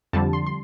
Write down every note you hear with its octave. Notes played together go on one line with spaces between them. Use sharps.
F2 D3 G3 A5
C6
C6